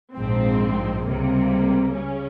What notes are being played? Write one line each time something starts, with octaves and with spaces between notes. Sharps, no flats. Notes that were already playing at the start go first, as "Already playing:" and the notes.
A#1 G#2 F3 C4
C#2 C3 G3 A#3
C#3 G3 C#4